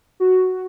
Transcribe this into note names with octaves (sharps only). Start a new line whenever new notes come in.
F#4